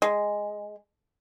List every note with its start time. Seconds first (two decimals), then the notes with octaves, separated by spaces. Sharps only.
0.02 G#3